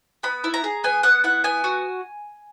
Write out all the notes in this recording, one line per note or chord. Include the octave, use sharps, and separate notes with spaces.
B3 B5
E4
A#5
G#4
B3 G#5
B3 F#5
E4 F#5
B3 G#5
F#4